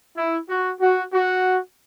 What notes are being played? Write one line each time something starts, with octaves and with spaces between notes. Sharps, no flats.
E4
F#4
F#4
F#4